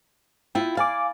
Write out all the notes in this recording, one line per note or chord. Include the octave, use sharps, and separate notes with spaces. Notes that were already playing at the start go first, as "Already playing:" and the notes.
E4 F4 G5
D5 F5 G#5 D6